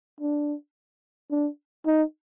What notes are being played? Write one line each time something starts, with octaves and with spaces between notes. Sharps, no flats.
D4
D4
D#4